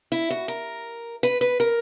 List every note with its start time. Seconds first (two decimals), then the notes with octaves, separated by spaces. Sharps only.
0.12 E4
0.30 F#4
0.48 A#4
1.23 B4
1.41 B4
1.60 A#4